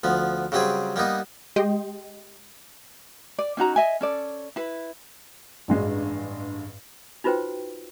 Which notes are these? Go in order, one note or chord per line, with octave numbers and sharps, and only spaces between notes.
D2 F3 B3
C#3 F#3 G3 C4 G#4
G3 A#3 B3 D#4
G#3 G4 D#5 G5 C6
D5
C#4 D#4 F#4 A#5
D#5 E5 G#5
C#4 A4 D5
E4 B4
A1 G2 G#3 D4
D#4 F4 F#4 B4 C5 G5